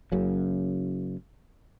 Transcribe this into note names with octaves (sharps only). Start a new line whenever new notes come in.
F#1 F#2 C#3